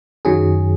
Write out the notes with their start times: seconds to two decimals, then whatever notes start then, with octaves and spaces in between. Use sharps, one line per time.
0.25 F#2 D#3 F#3 G#4